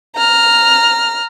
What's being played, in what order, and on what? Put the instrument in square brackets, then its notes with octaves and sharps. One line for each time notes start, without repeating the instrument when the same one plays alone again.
[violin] A#5 F6